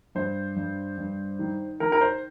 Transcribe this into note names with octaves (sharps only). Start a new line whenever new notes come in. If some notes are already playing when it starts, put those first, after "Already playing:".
G2 C5
G2
G2
D#3
D#3 A#4
A#4
C5